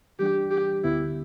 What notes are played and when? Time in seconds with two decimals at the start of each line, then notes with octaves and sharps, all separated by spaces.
0.19 E3 G3 D4 G4
0.51 G4
0.84 D2 D3 B3 E4